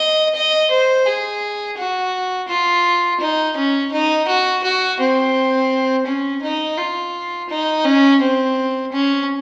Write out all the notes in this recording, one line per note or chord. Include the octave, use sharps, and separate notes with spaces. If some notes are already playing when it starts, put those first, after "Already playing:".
Already playing: D#5
D#5
C5
G#4
F#4
F4
D#4
C#4
D#4
F#4
F#4
C4
C#4
D#4
F4
D#4
C#4
C4
C#4